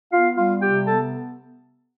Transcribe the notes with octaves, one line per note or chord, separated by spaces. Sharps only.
B3 F4 F5
G3 F4 F5
C3 G4 G5
B3 A4 A5